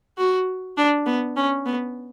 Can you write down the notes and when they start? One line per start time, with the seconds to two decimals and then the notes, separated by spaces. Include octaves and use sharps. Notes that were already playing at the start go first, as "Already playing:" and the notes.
0.18 F#4
0.77 D4
1.06 B3
1.37 C#4
1.66 B3